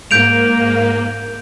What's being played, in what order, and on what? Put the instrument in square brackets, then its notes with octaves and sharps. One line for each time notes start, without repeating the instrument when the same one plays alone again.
[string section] G#2 A#3 [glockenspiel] G6 D7 F7